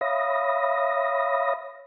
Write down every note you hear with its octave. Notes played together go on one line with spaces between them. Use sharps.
C#5 E5 F5 B5 D#6 A#6